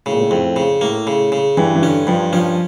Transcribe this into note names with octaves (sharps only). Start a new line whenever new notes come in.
A2 C#3
A#2
A2
F2
C#3
A2 A#3
C#3
C#3
G2 E3
E3
D3 C#4
G2 F3
F3 C#4